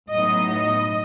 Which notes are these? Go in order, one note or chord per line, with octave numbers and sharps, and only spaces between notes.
A2 F#3 B3 D#4 D#5
D#5